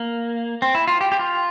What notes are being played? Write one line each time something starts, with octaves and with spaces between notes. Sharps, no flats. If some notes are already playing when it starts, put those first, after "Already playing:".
Already playing: A#3
C4
E4
F4
G4
G4
F4